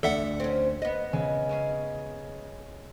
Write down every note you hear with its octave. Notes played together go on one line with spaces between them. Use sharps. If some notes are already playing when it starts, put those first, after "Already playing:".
D2 D4 A4 E5 F#5 G7
C4 C#4
B3 D#5
C#3 G#3 G#5
G#3 C#4 G#4